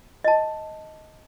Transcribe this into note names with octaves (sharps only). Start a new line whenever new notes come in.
D#5 A5